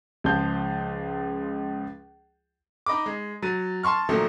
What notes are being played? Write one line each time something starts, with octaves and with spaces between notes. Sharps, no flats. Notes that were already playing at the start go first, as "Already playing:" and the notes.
C#2 F3 G#3 F5 A5 G6
D#4 D#5 B5 D6
G#3
F#3 A6 D#7
A5 C6 C#6 F6
A#2 D#3 F3 F#3 A3